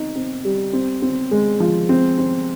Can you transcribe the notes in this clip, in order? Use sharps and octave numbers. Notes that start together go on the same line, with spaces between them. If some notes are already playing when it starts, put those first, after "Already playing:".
Already playing: C4 D#4
C4
G3
C4
C4
G#3
F3
C4
C4